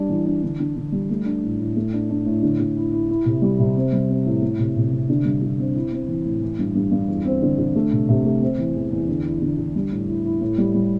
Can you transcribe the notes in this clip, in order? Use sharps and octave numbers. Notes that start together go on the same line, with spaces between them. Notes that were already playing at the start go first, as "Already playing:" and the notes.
Already playing: G3 D4
E3
D4
D3
D3
D3
G3
A3
D4
A2
A2
A3
D4
D4
A2
D3
D3
E4
E4
E4
C3
G3
C3
C4
G3
C4
A2
A3
C3
C3
C3
D3
G2
D3
C4
E4
C4
E3
A2
E3
G2
G2
G2
E2
C4
D3
D3
A3
C3
C3
A3
C4
E3
E2
E2
D3
E4
D3
D3
G3
A2
E4
E4
A2
G3
G3